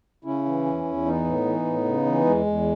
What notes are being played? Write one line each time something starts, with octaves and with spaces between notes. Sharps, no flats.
C#3 C#4 E4
E3
E2
E2
E3 B3 D#4
A2
E3
A2
C#3
E3
E2 G#3
E2